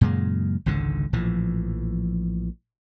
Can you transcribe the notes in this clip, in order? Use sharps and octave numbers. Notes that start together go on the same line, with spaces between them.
F#2 A#2 C#3 G#3
G#1 C#2 G#2 D3
A#1 A2 E3 F3